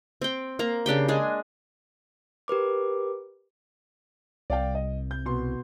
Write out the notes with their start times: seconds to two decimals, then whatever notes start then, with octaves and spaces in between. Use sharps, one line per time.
0.22 C4 G5
0.59 A#3 A#5
0.86 C#3 D4 G4 G5
1.08 G#3 D4 G#4
2.48 G4 A#4 B4 D6
4.50 C2 D5 F5 G5
4.75 D#5
5.11 G6
5.25 B2 C6